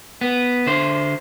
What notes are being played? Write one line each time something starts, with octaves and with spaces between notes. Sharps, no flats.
B3
D3 C5